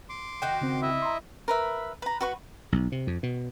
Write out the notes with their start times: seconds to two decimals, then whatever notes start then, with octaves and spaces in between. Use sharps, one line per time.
0.09 C6 D6
0.42 D#3 F#4 G5
0.61 C#3 C4
0.82 E4 D#5 E5
1.02 A#5 C6
1.48 A#4 B4 E5
2.02 B4 A#5
2.21 F#4 B4 C#6
2.72 B1
2.92 C3
3.07 F2
3.23 B2